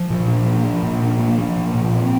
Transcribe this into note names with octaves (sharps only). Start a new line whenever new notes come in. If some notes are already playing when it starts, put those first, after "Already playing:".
Already playing: F3
A#2
D4
A#3
F3
A#2
D4
A#3
F3
A#2
A#2
C4